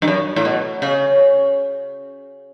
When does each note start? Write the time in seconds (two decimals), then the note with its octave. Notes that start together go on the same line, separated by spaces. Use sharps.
0.02 G2
0.08 F#2
0.36 A2
0.45 B2
0.82 C#3